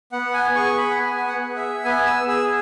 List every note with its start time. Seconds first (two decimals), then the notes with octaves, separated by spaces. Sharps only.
0.12 B3 F#5
0.33 G#5
0.55 G#4 C#6
0.77 B5
0.90 F#5
0.99 B3 G#5
1.27 F#5
1.41 G#4
1.56 E5
1.84 B3 G#5
2.06 E6
2.27 G#4 E6